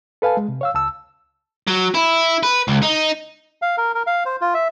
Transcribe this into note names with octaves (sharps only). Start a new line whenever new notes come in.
A4 B4 F5 G#5 A5
G#3
C3
C#5 F5 E6
C#2 A5 E6
F#3
E4
B4
C#2
D#4
F5
A#4
A#4
F5
C5
F4
E5